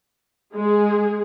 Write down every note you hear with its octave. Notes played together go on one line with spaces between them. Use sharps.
G#3 G#4